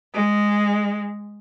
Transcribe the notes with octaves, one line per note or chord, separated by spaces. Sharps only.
G#3